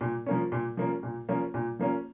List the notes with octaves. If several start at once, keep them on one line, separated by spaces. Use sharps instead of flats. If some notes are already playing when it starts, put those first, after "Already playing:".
A#2
F3 A#3 C#4
A#2
F3 A#3 C#4
A#2
F3 A#3 C#4
A#2
F3 A#3 C#4